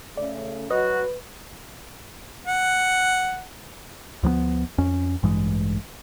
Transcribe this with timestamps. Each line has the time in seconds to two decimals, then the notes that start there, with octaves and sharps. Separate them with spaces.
0.17 C#3 A3 D5
0.70 F#3 F#4 B4 D#5
2.47 F#5
4.23 D2 F3 G3 B3
4.78 F2 C#4
5.23 A1 G2 E3 G#3